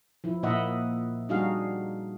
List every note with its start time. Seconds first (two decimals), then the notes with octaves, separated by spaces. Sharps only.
0.24 F3 E4
0.43 A#2 A#3 E4 D#5 E5 F#5
1.29 G3 D4 D#4 F#4 G#4 F5